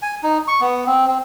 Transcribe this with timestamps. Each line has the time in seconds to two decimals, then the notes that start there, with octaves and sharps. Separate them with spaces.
0.02 G#5
0.23 D#4
0.48 C#6
0.61 B3
0.87 C4
1.08 C4